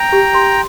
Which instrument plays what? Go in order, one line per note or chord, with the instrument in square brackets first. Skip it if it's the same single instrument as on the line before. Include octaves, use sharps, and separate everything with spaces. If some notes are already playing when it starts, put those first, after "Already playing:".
Already playing: [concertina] G5 A#5
[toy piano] G4
C6